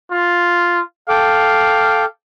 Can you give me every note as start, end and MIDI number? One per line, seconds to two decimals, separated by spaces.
0.12 0.81 65
1.09 2.05 69
1.09 2.05 77
1.09 2.05 79
1.09 2.05 86